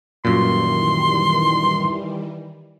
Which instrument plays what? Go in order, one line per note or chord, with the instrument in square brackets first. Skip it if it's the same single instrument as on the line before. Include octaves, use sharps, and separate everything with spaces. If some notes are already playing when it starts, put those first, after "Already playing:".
[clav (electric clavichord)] F#2 A#2 [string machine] D#3 E3 G3 [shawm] C6